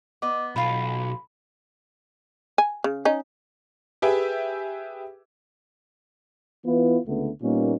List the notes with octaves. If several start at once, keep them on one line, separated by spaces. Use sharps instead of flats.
B3 D#5 D6
B1 F4 F5 B5
G#5
C#3
C#4 D#4
G4 G#4 B4 E5 G5 G#5
E3 B3 E4 F4 B4
C#2 D3 A3 B3
A#2 G3 A#3 B3 C#4 D#4